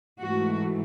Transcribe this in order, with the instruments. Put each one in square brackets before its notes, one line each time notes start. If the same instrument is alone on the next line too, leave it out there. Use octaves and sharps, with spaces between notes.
[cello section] G#2 E3 A3 F#4